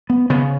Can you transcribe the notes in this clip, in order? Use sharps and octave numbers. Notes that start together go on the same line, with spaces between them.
B3
C#3 B3